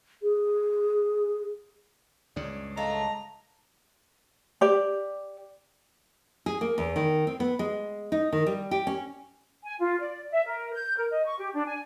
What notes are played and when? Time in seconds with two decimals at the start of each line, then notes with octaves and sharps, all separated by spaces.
0.22 G#4
2.36 C#2 G2 C#3 D5
2.77 A3 D#5 F5 A5 A#5
4.61 G4 D5
6.46 G#4
6.61 A#3
6.78 E2
6.96 D#3
7.27 C4
7.40 B3
7.59 G#3
8.12 D#4
8.33 D#3
8.46 G3
8.71 G4
8.87 C#4
9.63 G#5
9.80 F4
10.00 D5
10.31 E5
10.46 A#4
10.73 G6
10.97 A#4
11.10 D#5
11.25 C#6
11.39 G4
11.54 D4
11.66 G#5